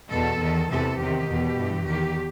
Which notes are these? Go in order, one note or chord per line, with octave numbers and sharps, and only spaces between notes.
E2 B2 A4
E2 D#3
E2 C3 E3 A4
E2 C3 D#3 G4
E2 B2
G2 E3
E2 D#3 G4